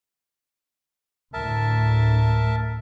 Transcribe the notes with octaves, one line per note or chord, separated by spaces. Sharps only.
D2 A2 A#4 E5 A5